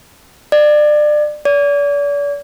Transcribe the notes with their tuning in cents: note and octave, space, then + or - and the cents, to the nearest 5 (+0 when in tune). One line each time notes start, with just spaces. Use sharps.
D5 +30
D5 -40